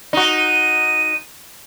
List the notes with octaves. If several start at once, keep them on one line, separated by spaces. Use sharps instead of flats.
D#4 F#4
D#7